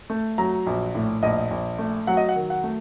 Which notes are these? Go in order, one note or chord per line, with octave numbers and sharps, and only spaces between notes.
A3
F#3 A#5
A#1
A2
A#1 D#5
A#1
A3
F#3 F#5
D#5
F#5
D#3
F#5
A3